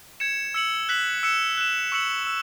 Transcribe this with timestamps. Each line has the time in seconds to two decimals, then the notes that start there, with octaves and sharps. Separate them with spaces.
0.20 G#6 C#7 E7
0.54 E6 C#7 F#7
0.89 F#6 B6 F#7
1.23 E6 C#7 E7
1.57 F#6 E7
1.92 C#6 E6 C#7 F#7
2.27 E6